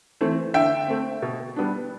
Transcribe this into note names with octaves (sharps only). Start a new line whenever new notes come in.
E3 A3 C4
D3 E5 G5
A3 C4
B2
G3 B3 D4